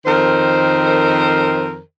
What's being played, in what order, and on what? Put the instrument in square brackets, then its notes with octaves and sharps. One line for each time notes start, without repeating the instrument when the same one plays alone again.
[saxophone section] F2 D#3 A#4 C5